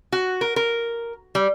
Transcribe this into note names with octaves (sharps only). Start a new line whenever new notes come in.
F#4
A#4
A#4
G3